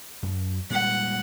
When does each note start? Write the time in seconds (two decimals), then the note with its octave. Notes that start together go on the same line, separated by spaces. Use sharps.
0.23 F#2
0.70 A#2 G3 G#3 F#5